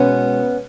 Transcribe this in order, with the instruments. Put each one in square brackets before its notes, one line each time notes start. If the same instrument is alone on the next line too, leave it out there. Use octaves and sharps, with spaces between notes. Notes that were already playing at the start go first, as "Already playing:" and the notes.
Already playing: [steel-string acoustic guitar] B2 G#3 B3 C#4